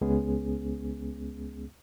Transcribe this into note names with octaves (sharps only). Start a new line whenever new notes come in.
C#2 G#3 B3 C#4 G#4